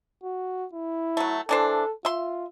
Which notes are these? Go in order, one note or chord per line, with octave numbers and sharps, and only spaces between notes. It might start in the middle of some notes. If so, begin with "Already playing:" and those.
F#4
E4
F#3 A3
E3 D4 A4 C5
F4 E5 C6